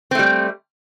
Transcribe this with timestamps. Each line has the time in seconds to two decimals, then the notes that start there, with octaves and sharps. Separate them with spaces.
0.11 C4
0.15 A3
0.19 G3